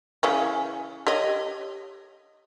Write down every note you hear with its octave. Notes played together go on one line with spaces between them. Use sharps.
C#3 E3 C#4
G4 C#5 D#5